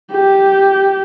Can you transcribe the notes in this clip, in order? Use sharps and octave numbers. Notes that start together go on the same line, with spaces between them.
G4